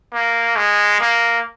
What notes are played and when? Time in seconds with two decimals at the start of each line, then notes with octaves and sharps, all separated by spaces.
0.13 A#3
0.56 G#3
1.00 A#3